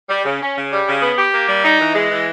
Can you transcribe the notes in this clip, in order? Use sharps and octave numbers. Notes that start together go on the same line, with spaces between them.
G3
C#3
C#4
C#3
G3
C#3
B3
G4
A#3
G3
D#4
E3
G#3
E3